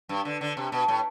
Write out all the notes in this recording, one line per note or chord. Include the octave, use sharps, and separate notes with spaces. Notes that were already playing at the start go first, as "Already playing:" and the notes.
G2
D3
D3
C3
B2
A2